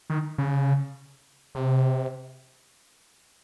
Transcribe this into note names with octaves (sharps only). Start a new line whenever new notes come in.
D#3
C#3
C3